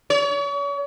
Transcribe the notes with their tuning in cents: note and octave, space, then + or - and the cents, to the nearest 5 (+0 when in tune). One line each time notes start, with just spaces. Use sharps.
C#5 +40